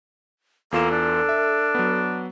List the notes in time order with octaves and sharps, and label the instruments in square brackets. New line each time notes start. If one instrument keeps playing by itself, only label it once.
[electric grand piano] E2 F4 E7 [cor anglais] A#3 [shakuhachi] A4
[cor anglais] D4
[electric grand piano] E5
F#3 B3